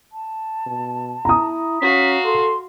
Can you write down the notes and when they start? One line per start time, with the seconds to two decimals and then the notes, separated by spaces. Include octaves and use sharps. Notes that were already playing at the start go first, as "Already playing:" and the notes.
0.12 A5
0.67 B2
1.25 E4 A#5 D#6
1.82 C#4 F#4 F5 B6
2.25 A4 C6